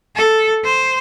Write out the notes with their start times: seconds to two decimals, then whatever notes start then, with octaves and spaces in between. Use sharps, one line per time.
0.15 A4
0.64 C5